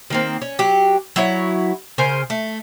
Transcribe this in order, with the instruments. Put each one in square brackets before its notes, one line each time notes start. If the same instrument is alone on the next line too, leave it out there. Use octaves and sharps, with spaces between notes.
[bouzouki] D#3 A#3 C4
C#4
F#3 G4
F#3 E4 C#5
C#3 A#4 C5 G#5
A3